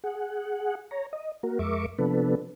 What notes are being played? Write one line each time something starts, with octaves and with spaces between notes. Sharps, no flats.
G#4 F#5
C#5 A#5
D#5
A#3 F#4 A#4
F2 G#3 A#4 E5 C#6 D6
C3 F3 B3 D4 A4 B4